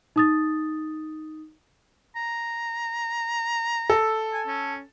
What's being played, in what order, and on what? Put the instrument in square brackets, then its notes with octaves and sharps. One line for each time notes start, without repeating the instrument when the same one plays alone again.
[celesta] D#4 D#6 A6
[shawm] A#5
[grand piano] A4
[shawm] G#5
C#4